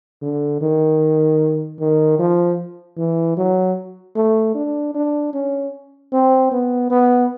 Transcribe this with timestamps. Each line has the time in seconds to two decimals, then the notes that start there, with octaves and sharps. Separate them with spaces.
0.22 D3
0.61 D#3
1.79 D#3
2.19 F3
2.97 E3
3.37 F#3
4.15 A3
4.55 D4
4.95 D4
5.33 C#4
6.13 C4
6.52 B3
6.90 B3